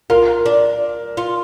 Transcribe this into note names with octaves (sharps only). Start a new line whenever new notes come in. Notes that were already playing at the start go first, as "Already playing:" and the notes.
F4 A#4
D4
F4